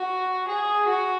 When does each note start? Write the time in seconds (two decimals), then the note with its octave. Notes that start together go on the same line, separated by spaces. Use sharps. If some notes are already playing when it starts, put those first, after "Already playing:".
Already playing: F#4
0.48 G#4
0.88 F#4